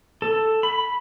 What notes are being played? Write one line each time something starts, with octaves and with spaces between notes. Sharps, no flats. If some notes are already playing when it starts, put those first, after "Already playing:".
A4
B5